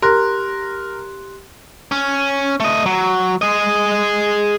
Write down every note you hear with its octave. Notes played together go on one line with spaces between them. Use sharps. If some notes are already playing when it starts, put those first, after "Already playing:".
G4 A#4 C6 F#6
C#4
A3 D#5
F#3
G#4 D#5